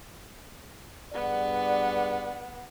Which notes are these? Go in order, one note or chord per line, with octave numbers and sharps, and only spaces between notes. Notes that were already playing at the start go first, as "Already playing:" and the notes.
G2 B3 G#4 D5 F#5